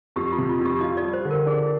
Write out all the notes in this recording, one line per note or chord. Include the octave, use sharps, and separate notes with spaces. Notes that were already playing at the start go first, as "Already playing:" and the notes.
F2 G4
F4
C3
F4
F2
G4
F4 D#5
D5
G3
C5
D3
A#4
D4 G#4